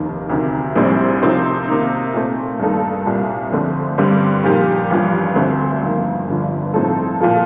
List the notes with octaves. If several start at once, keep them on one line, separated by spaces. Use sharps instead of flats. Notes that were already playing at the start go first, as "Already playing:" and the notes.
Already playing: F1 D#2 D#3
D2 C3 D#3
A#1 A2 G3 C4
C3 F3 C4 D#4
C3 D#3 A#3 D#4
A#2 A3 C4
G2 D#3 A#3 D#4 A4
C2 A#2 G3 A#3
F2 D3 A3 C4
G2 D3 G3 C4 G4
A#2 F3 A#3 D#4 G4
A1 G2 F3
D2 D3 A3 C4
G1 F2 D#3 A#3
G1 G2 D3 F3
A2 F3 C4 D#4 A4
A#2 F3 A#3 F4 A4